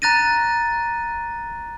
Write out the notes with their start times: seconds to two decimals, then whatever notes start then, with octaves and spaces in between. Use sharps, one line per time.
0.02 A#5 F#6 A6 A#6 D#7